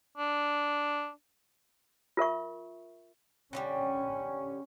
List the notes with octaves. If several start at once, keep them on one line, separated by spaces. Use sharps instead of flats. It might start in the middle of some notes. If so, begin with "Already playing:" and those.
D4
F4 A#4 E5 C#6
D3 F3 G3 C#4